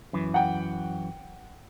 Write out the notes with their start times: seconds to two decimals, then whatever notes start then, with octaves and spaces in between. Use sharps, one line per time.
0.13 F#2 E3
0.34 F#5 G5